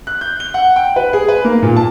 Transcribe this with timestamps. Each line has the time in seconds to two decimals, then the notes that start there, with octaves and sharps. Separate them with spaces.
0.07 F#6
0.21 G6
0.40 G7
0.54 F#5
0.76 G5
0.96 B4
1.13 G#4
1.28 B4
1.44 A#3
1.63 A#2
1.76 A5